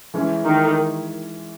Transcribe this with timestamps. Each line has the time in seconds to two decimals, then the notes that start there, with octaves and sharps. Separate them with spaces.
0.14 E3 G#3 C#4
0.45 D#3